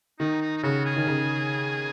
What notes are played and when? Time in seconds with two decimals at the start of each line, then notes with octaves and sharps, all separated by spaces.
0.19 D#3 D#4
0.42 D#4
0.58 D#4
0.63 C#3 F#4
0.86 G#4
0.96 D#3
1.07 C#3